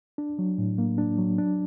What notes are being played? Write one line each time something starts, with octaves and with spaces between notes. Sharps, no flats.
D4
F#3
A2
A#3
D4
F#3
D4